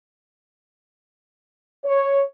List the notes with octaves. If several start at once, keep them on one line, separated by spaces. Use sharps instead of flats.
C#5